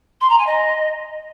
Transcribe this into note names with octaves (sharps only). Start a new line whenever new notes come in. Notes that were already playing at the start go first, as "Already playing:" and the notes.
C6
A#5
G#5
D#5